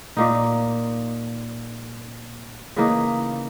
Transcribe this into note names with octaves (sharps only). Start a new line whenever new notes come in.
A#2 A#3 D#4
C#3 E3 A#3 D#4